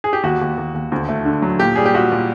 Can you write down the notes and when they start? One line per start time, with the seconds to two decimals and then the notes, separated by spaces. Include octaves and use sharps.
0.04 G#4
0.13 G4
0.23 D#2 F#4
0.41 D#2
0.58 D#2
0.74 D#2
0.92 D2
1.09 A3
1.25 D3
1.42 F#3
1.59 A#2 G4
1.76 G3 G#4
1.86 G4
1.94 A#2 F#4
2.12 A#2